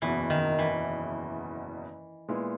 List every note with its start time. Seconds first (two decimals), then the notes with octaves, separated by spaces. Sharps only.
0.02 F#1 E2 B2 E3
0.30 D#3
0.59 E3
2.29 A#2 G#3 B3 E4